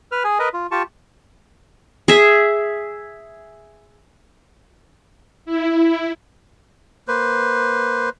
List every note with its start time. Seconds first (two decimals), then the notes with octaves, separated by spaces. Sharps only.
0.12 B4 F6
0.24 G#4 G#5
0.39 A#4 B4 D#5
0.54 F4
0.71 F4 G4 A5 C#6
2.08 G#4 E5
5.46 E4
7.08 A#3 B4 C5